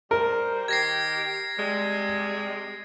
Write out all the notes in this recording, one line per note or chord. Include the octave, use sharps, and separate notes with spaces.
G3 A#4 C5
D#3 G4 G#6 A#6 C7
C3 G3 G#3